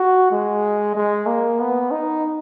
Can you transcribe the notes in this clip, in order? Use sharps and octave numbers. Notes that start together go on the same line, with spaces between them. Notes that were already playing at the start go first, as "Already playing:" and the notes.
Already playing: F#4
G#3
G#3
A#3
B3
D#4